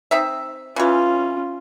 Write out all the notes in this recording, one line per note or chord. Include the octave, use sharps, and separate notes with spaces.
C4 D#4 E5
C#3 E3 C#4 F4